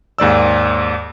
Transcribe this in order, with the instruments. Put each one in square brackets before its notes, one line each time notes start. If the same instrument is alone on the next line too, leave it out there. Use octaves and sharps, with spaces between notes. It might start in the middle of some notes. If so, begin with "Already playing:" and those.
[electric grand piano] D#2 G#2 D5 E6